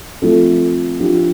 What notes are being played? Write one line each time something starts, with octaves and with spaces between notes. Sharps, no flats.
F3 A3 C4 A4
F3 D4 G4